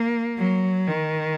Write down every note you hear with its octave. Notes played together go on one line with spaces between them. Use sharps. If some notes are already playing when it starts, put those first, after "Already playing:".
Already playing: A#3
F#3
D#3